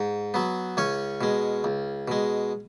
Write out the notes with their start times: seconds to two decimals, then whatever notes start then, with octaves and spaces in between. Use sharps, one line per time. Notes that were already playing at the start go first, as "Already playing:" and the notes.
Already playing: G#2
0.34 F#3 B3
0.77 C#2 C#4 C#5
1.21 B2 G#3
1.64 C#2
2.08 B2 G#3